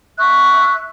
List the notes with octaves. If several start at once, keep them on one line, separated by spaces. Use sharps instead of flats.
E5 C#6 E6 F#6